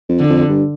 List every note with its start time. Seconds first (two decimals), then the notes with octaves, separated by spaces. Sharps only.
0.09 F2
0.20 D3
0.30 F2
0.49 G2